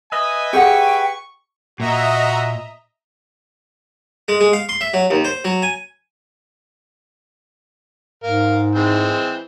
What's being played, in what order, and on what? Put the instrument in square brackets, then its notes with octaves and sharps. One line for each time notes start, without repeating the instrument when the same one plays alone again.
[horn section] B4 E5 G#5 [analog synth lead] D#5
[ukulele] G4 G#4 F#5 [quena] G5 [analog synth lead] C#6
[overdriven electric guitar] A#2 [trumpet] F#4 [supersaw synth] D#5 E5 A#5
[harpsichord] G#3
G#3
F5
C6
E5
F#3
D#2
C5
F#3
G#5
[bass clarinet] G#2 [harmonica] A#4 F5
[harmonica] E3 G#3 C4